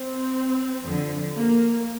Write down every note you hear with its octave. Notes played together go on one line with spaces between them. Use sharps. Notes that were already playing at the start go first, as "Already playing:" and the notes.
Already playing: C4
F2 D3 F3
A#3